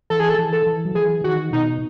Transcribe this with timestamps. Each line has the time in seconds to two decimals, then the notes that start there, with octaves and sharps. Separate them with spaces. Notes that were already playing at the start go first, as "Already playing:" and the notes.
0.10 E3 A4
0.20 G#4
0.29 A4
0.39 E3
0.53 A4
0.66 E3
0.85 F#3
0.95 E3 G#4
1.24 D#3 F#4
1.53 B2 D#4